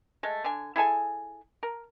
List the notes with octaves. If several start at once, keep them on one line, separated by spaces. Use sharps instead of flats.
G#3 A3
D3 G#5
E4 G#4 A4 G#5
A#4